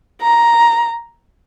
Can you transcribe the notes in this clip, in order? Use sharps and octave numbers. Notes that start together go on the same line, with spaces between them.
A#5